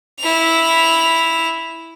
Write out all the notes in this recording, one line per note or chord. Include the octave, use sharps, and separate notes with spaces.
E4 F7